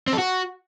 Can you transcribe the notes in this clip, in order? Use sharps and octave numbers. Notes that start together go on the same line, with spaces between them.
C4
A4
F#4